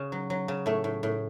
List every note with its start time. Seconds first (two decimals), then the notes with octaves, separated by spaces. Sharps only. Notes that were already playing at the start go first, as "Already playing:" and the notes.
Already playing: C#3 F#4
0.12 F#3
0.30 F#3
0.48 C#3
0.66 A2 A3
0.84 A2
1.03 A2